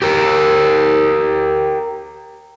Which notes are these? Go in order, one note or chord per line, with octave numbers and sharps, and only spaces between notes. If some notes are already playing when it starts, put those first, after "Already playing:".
G4 A#4